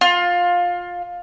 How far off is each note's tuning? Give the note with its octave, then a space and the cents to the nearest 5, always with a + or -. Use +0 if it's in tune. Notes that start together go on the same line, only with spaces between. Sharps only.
F4 +15